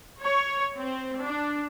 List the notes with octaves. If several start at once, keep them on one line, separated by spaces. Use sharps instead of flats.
C#5
C4
D4